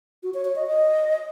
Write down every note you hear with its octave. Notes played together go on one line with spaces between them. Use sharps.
F#4
C#5
C#5
D#5
D#5